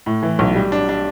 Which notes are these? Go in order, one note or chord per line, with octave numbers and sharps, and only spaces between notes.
A2
E3
B1
G3
D4
D4